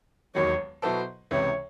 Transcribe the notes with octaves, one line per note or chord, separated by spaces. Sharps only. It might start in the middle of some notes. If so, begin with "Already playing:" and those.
E1 D#2 D#3 F#3 C#5
B2 F#3 B3 E4 A4 C5
C#2 C3 E3 C#5